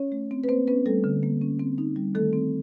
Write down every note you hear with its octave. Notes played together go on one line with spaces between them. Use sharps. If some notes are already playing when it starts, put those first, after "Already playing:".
Already playing: C#4 C#5
A3
C4
B4
A#3 C4 C5
B3 C#4 B4
G3 A3 A4
D3
A#3
C#4
C4
D#4
G3
D#3 A3 A4
C4